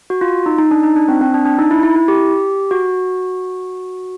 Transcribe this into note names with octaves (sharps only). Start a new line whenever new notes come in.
F#4
F4
D#4
D#4
D4
D#4
D4
C4
C4
D4
D4
D#4
E4
E4
E4
G4
F#4